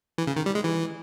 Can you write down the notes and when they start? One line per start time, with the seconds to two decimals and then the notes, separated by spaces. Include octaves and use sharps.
0.18 E3
0.27 C#3
0.37 D#3
0.46 G3
0.55 G#3
0.64 E3